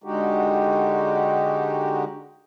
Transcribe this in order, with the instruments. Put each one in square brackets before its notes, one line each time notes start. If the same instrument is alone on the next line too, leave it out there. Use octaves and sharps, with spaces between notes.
[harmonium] D3 G#3 D#4 F#4 G4